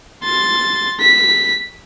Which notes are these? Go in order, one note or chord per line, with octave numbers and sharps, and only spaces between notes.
C6 A6
B6